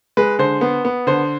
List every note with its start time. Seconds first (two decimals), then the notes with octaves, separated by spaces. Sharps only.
0.17 G#3 B4
0.39 D3 C5
0.61 B3
0.85 B3
1.07 D3 C5